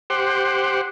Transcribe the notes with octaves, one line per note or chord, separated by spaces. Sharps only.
G4 C5 F#5